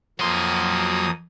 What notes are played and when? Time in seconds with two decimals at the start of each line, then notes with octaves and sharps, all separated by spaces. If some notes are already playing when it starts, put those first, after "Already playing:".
0.19 F2 F#3 A#3 C6 D#6